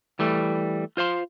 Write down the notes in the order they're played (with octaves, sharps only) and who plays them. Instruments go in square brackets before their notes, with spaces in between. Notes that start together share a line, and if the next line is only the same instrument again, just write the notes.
[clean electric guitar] E3 G3 A3
F4 C5 F5 C6